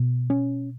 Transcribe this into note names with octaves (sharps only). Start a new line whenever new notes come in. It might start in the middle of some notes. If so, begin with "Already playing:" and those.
Already playing: B2
C#4